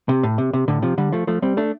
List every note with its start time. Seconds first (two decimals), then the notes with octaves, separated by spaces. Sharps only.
0.09 C3
0.23 A2
0.38 C3
0.53 C3
0.68 A2 D3
0.82 C3 F3
0.98 D3 G3
1.12 F3 A3
1.27 F3 A3
1.42 G3 C4
1.57 A3 D4